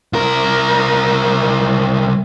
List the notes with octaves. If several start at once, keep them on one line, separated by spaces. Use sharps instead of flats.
C2 A#4